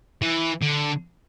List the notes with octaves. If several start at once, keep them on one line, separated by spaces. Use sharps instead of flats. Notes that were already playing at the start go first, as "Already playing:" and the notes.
E3
D3